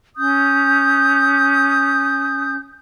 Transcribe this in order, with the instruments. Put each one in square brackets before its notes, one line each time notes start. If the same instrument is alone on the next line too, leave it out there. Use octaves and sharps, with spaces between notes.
[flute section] C#4 D#6 G6